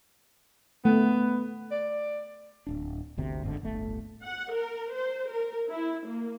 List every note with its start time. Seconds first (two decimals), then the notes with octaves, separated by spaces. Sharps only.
0.85 A3 B3
1.71 D5
2.67 D1 D4
3.17 G1 D2 C3
3.43 G1 G#2 D3
3.61 D1 G1 A3
4.25 F#5
4.54 A#4
4.94 C5
5.31 A#4
5.70 E4
6.07 A#3